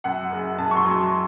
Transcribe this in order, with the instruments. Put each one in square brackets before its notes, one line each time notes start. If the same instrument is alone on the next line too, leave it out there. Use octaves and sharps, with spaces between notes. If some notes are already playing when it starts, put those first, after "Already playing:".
[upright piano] F#2 F#5
F#1
F#2 A5
C#6
C6
F#3